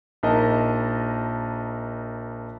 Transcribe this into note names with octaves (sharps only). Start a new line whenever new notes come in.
A#1 D#4 A#4 D#5 A5